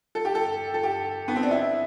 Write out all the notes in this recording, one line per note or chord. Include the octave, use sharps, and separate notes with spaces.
A4
G4
A4
A4
G4
B3
C4
D4
E4